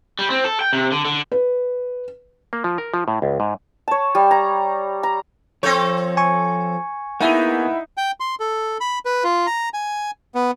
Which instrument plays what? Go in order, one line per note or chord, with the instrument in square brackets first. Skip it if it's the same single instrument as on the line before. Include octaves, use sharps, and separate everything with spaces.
[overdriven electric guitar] G3
C4
A4
G5
C3
D3
D3
[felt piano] B4
[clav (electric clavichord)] A#3
F3
A#4
F3
A2
C#2
G#2
[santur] C#5 A5
G3
A#5
A#5
[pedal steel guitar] F3 G6 [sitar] C4 A4 C#5
[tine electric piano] G#5 C#6
[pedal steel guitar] A#3 B3 G#4 [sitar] D#4 [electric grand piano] E4 E5 F#5
[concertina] G5
C6
A4
B5
B4
F4
A#5
G#5
B3